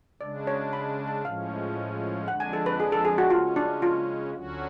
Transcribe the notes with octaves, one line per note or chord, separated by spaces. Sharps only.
C#3 G#3 D4 D5
C#5
B5
A5
A2 F3 G#3 C#4 F5
F2 D3 G#3 D4 F#5
G#5
A4
B4
G#4
A4
G#4
F#4
C#3 G#3 C#4 F4
D4
F4
D2 D3 F#3 C#4 F#4